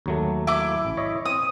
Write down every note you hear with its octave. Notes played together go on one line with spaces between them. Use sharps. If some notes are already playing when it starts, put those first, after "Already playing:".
D#2 F#3 A3
E4 D6
A1
C#5 D#5 E5
C4 D#6